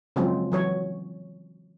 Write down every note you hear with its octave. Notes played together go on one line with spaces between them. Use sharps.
C#3 F3 F#3 G#3 C4
E3 F#3 C#5